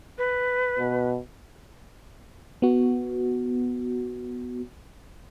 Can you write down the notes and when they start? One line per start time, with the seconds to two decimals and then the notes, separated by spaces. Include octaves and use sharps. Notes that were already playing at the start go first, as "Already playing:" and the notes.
0.18 B4
0.79 B2
2.62 B3 F#4